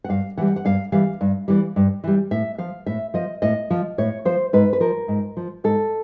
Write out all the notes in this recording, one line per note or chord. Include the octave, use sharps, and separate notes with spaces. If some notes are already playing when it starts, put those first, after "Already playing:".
F#5
G2 F5
E3 G3 F#5
F#5
G2 F5
E3 G3 F5
G2
E3 G3
G2
E3 G3
A2 E5
F3 F5
A2 E5
F3 D#5
A2 D#5
F3
A2 C#5
F3 C5
G#2 B4
B4
F3 A#4
G#2
F3
G#2 A4